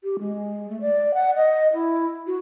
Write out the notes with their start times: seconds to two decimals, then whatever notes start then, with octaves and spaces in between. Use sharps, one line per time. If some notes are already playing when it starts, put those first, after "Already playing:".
0.04 G4
0.19 G#3
0.69 A3
0.81 D5
1.14 F#5
1.36 D#5
1.74 E4
2.27 F#4